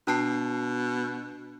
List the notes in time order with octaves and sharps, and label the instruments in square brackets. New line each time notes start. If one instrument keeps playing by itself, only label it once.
[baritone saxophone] B2 [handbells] D4 A5 C7